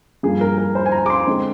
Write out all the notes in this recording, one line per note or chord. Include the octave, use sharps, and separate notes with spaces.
G2 F3 A#3 G#4
A#4
A#4
C5
G#5
A#5
D6
C6
D3 G#3 C4